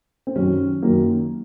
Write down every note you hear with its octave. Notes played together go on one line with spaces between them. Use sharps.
C4
F#2 D#3 F#3 C#4
F#2 D#3 F#3 A#3